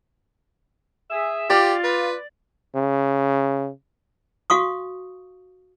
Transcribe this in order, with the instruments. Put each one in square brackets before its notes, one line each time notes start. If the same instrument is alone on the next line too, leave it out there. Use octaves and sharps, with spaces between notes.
[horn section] G#4 E5
[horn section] F4 [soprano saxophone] G4 [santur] D5
[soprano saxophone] B4
[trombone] C#3
[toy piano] F#4 F5 C#6 D#6